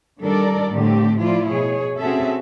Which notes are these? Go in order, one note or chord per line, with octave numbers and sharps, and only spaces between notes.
D#3 G3 D4 A4 A#4 D5
A2 D3 A3 C4 G4
F3 E4 F4 D5
B2 G#4 C#5
C4 C#4 F#4 G#4 A4 E5